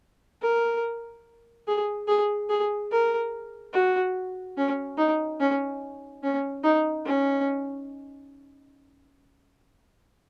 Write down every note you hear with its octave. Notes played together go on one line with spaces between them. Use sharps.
A#4
G#4
G#4
G#4
A#4
F#4
C#4
D#4
C#4
C#4
D#4
C#4